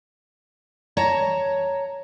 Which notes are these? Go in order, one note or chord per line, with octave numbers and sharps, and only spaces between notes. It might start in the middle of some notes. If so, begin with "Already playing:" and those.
C#5 A5 A#5